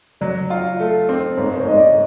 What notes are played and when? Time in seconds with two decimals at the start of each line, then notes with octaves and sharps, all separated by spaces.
0.21 F#3 D5
0.50 F4
0.80 A3
1.09 C4
1.37 G#2 C#5
1.57 C#5
1.67 G#2 D#5
1.77 D5